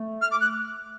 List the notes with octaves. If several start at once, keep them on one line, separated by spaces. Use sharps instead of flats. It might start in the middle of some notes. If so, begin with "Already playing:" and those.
Already playing: A3
F6
D6
F#6